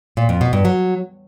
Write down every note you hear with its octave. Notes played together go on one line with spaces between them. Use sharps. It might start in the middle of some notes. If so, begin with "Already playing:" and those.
A#2
F2
B2
G2
F#3